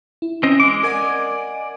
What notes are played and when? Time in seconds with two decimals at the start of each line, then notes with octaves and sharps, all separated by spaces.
0.22 E4
0.43 E3 C4 C#4 D#5
0.60 G#3 D6
0.83 A#4 D5 D#5 F#5 G#5